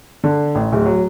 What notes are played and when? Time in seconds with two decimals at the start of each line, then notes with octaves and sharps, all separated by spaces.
0.24 D3
0.55 A1
0.72 D1
0.85 F#3